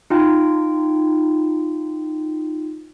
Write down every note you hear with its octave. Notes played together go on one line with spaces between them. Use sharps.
D#4 F4 G5